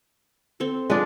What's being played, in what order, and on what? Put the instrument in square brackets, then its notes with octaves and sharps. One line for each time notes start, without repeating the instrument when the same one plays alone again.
[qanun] C4 A4
[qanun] F3 B4 [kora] G#3 D4